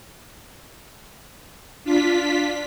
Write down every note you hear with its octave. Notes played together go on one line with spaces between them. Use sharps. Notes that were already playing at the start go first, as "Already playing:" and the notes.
D4 F4 B6